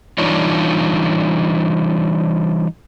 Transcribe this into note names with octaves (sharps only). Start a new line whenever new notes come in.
E3 G3 D4 D#4 F4 C#5